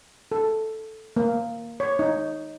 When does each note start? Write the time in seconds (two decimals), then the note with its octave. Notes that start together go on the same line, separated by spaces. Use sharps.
0.32 A4
1.16 A#3
1.80 C#5
1.99 D#4